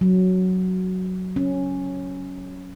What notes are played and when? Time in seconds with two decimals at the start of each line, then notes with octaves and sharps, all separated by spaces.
0.01 F#3
1.36 C#4